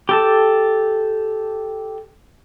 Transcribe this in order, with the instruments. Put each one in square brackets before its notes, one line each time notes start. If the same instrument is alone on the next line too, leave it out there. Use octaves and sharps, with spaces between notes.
[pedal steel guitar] G4 A4 A5